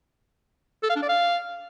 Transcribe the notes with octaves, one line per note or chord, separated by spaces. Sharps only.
A4
F5
D4
D5
F5